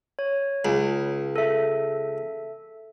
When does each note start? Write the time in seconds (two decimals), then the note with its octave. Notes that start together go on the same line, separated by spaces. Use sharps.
0.19 C#5
0.65 C#2
1.36 A4 E5